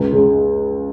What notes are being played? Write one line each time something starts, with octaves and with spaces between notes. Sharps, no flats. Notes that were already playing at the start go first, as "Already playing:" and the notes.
Already playing: C#2
C#3 G#3